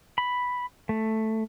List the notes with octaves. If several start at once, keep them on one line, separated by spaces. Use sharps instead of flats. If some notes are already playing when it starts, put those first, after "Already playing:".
B5
A3